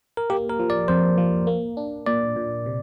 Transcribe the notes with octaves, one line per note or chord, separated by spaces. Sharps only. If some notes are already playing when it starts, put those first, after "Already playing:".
A#4
A#3 G4
A#4
F3
D5
F2 C5
F3
A#3
D4
A#2 D5
A#2
C3